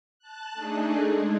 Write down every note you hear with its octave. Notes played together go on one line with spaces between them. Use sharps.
A5 F#6
A3 D4 D#4 G#4
G#3